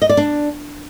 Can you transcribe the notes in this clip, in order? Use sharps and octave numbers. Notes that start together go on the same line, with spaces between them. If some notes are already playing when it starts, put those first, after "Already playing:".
D#5
D5
D4